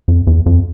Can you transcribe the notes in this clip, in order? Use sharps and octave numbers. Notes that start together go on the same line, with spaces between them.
F2
E2
F2